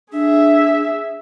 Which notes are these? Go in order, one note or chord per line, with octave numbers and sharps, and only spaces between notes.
D4 G#4 E5